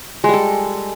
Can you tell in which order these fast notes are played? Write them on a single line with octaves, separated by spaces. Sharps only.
G#3 G3 A4